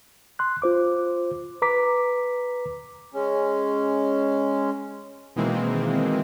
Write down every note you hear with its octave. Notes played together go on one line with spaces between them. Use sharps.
C6 F#6
F4 C5 D6
B4 A#5 D6 B6
G#3 C#4
B2 D#3 E3 G#3 A#3 C4